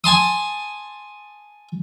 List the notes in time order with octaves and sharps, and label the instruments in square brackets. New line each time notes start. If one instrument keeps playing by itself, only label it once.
[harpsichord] G#5 A5 C6 D#6